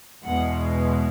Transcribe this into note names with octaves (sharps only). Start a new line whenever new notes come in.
E2 B2 G#3 F#5